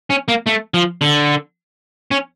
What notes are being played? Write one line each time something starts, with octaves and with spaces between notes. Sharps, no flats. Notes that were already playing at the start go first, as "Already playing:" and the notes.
C#4
A#3
A3
F3
D3
C#4